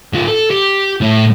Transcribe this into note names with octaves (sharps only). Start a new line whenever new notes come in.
G#2 F4
A4
G4
A2